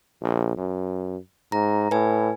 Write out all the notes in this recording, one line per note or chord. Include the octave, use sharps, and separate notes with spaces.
A#1
F#2
G#2 A#5
A2 B4 G#5